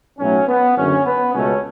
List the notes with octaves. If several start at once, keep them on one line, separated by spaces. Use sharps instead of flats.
B1 A2 F#3 A3 C#4
B3
F#1 F#2 D3 C#4
B3
C#2 B2 A3 C#4